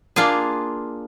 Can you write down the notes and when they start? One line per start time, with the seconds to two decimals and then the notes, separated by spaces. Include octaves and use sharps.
0.16 A#3 D4 F4 G#4